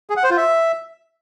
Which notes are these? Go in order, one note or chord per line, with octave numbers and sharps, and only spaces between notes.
G#4
F#5
C5
F4
E5